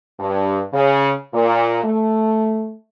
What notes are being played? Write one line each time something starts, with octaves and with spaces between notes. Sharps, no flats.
G2
C#3
A#2
A3